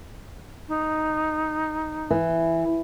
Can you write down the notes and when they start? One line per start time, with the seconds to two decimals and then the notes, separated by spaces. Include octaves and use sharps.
0.68 D#4
2.10 E3